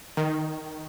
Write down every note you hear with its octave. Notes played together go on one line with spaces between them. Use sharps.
D#3